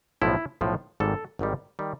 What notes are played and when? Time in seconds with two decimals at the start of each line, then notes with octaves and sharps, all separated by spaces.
0.22 B1 A2 F3 E4
0.61 B1 A2 F3
1.00 G#1 G#2 D#3 G3 A4
1.39 G#1 G#2 D#3 G3
1.79 D#3 G3